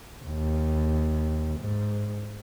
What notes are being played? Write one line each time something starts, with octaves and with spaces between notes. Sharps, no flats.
D#2
G#2